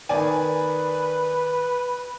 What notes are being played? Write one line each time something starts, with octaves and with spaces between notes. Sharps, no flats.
D#3 B4 D5 G#5